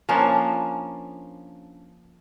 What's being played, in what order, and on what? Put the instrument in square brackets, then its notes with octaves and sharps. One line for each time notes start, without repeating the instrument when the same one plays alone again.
[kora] F3 A#3 C#4 D4